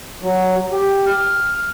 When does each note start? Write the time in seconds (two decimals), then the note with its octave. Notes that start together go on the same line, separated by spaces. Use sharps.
0.23 F#3
0.72 G4
1.06 F6
1.55 F6